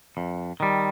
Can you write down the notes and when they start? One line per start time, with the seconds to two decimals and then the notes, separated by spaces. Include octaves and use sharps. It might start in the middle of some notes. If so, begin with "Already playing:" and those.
0.17 F2
0.60 D#3 G3